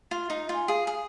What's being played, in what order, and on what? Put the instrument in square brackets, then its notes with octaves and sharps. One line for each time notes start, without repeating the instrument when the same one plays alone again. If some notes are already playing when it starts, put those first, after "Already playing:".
[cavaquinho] F4
D#4
F4
[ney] G#5
[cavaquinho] G#4 [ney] F5
[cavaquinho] G#4